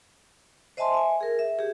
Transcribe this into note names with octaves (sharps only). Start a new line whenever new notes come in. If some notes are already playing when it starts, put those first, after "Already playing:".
C5 D#5 E5 G#5 A5 C6
E5 G#5
G#4 A#4
E5
G4 G#4